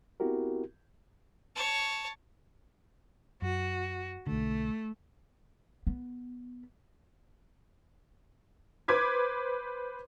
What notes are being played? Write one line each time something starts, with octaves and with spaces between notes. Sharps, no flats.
B3 C4 E4 F#4 G4 A#4
C#5 A5
F#2 F#4
B1 D3 A3
B3
B4 C5 D6 G#6 B6